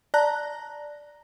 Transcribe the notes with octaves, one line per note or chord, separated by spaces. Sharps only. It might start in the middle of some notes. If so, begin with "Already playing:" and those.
D5 A5 A#5 F#6 A#6